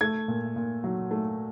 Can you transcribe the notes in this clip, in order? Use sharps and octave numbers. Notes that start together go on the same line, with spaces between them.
A3 G#6
A#2
A#2
F#3
A3